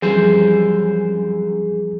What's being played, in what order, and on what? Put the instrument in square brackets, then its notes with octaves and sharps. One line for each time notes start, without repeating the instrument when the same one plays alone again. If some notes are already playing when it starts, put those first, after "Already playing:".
[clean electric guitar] F#2 E3 C5 [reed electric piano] F3 G3 C4 [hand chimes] G#4